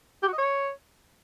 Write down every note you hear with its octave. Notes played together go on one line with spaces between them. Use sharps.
G4
F#4
D#5
C#5